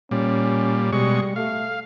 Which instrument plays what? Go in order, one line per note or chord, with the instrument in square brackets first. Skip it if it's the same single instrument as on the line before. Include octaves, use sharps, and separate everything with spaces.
[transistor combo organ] A#2 G3 [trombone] C#4
[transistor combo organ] B2 G#3 C#6 [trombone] G3
[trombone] A3 [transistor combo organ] F5